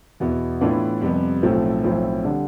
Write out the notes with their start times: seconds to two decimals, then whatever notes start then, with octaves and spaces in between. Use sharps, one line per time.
0.20 E2 B2 B3 E4
0.61 A2 E3 B3 D4 F4
1.01 F2 C3 G3 B3
1.43 B1 A2 F3 A3 C4
1.84 B1 A2 F3 C4 E4
2.24 D3 G3 D4